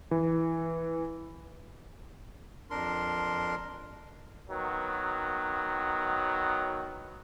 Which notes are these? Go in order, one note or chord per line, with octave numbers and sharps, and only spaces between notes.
E3
F2 D4 A#4 C6
D#3 F#3 B3